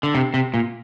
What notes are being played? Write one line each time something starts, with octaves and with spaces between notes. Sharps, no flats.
D3
C3
C3
A#2